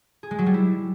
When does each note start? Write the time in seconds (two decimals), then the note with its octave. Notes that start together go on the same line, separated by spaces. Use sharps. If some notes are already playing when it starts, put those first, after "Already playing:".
0.23 G#4
0.31 G#3
0.39 F#3
0.46 G3
0.54 E4